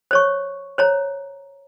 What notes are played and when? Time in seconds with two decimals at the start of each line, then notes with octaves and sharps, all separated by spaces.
0.11 C5 C#5 C#6
0.78 C5 C#5 A#5